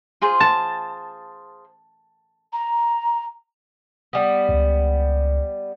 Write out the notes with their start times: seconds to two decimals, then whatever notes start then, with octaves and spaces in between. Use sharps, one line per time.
0.21 F4 G#4 C5
0.40 A5
2.52 A#5
4.13 G3 B3
4.49 C#2